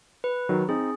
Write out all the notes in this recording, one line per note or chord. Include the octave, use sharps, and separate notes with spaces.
B4
D#3 F#3
C4 D#4 G#4